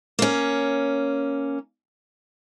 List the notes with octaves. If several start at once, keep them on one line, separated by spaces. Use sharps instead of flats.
A#3 C#4